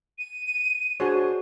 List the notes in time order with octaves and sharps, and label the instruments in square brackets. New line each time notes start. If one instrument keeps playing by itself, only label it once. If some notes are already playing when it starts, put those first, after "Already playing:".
[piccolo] D#7
[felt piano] D4 C5 [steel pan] F#4 G#4 C#5